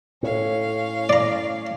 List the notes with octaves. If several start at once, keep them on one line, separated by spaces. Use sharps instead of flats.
A2 C#4 F5
D5 A#5